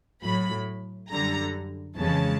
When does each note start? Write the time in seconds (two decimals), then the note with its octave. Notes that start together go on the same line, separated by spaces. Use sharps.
0.23 A2 F#3 B5
1.10 F#2 D3 G3 A#5
1.97 F2 C#3 E3 G#3 A5